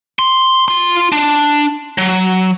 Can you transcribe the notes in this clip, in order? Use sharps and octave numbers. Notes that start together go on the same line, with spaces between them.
C6
F4 C6
D4
F#3